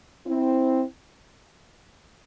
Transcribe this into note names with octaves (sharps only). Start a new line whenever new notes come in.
C4 E4